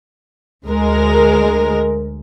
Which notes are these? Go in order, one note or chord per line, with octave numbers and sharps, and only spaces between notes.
D2 G#3 A#4